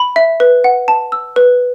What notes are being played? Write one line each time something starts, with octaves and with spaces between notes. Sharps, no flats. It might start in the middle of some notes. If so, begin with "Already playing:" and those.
Already playing: B5
E5
B4
F#5
A5
E6
B4